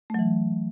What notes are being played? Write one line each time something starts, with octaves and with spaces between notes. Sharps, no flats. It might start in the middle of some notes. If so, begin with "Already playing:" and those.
E3 F#3 A3